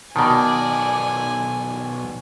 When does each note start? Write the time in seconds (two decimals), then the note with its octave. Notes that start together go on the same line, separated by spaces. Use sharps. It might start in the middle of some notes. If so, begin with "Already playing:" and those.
0.16 B1 B2 D#3 D5 G#5 A5